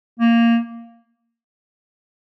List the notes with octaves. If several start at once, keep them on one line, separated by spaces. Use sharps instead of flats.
A#3